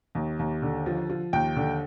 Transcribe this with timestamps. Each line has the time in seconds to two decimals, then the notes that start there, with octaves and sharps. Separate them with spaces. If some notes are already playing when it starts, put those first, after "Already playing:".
0.15 D#2
0.39 D#2
0.62 D3
0.86 F3
1.10 F3
1.33 D#2 G5
1.56 D3